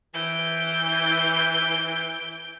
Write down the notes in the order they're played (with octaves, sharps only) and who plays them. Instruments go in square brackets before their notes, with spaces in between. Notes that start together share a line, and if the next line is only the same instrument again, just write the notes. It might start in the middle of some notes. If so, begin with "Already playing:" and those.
[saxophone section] E3 [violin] G6 D7